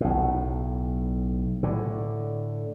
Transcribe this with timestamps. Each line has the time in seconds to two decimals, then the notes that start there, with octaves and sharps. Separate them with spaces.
0.01 B1 A2
1.63 A2 D3